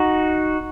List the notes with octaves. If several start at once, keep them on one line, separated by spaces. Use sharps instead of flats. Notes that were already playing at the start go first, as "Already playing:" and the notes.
Already playing: D#4 F#4